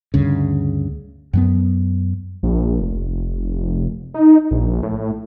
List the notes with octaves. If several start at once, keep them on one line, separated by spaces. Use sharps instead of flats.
D2 G2 C#3
F#2 F#3 B3
A#1
F1
D#4
A#1
A2